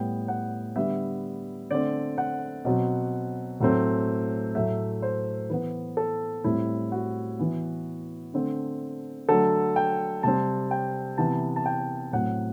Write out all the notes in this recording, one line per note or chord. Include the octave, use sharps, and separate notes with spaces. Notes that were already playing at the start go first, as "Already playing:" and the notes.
Already playing: A2 G3 B3 G5
F#5
D3 G3 B3 E5
D3 A3 C4 D5
F#5
B2 F#3 C4
A2 F#3 A3 C4
A2 F#3 A3 E5
C5
E3 B3 B4
A4
A2 G3 C4 E4
F#4
E3 B3
D3 A3 C4
D3 F#3 A3 A4
G5
C3 G3 C4 A5
G5
C3 E3 B3 A5
A5
G5
A2 F#3 C4 F#5